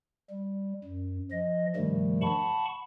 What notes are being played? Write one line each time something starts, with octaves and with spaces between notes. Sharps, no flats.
G3
F#2
F3 D#5
G2 C3 D#3 F3 G3 A3
F#5 A5 B5 C#6